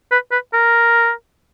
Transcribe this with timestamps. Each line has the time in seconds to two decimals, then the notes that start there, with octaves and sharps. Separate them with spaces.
0.11 B4
0.32 B4
0.53 A#4